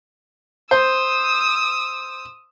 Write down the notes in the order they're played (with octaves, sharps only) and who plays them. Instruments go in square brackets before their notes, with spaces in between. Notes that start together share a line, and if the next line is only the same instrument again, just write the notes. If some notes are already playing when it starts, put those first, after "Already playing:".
[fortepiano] C5 [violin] D#6 E6